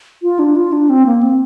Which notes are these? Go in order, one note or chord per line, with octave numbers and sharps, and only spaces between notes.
F4
D4
F4
D4
C4
A#3
C4